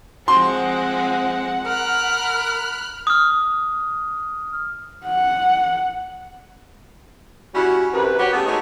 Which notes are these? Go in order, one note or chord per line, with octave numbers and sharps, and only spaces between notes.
F3 G#3 C4 F#5 C6
A#4 B5 F6 F#6
D#6 F6
F#5
G3 C#4 E4 F#4
F#2 C3 B4
F#3 F#4 G4 B4 C#5 F#5
C#3 A3 B3 G4
G#3 A3 D#4 F#4 C#5